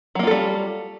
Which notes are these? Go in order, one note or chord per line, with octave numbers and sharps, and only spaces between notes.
F#3 G3 A#3 F4 A4